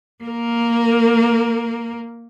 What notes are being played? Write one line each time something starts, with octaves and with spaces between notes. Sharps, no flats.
A#3 A#4